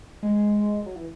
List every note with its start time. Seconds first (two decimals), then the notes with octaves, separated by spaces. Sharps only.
0.23 G#3
0.86 F#3
0.96 E3